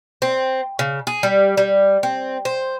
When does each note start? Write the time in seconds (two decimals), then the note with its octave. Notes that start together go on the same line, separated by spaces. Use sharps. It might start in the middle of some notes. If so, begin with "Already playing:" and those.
0.22 C4
0.79 C#3
1.07 G#4
1.23 G3
1.57 G3
2.03 C4
2.45 C5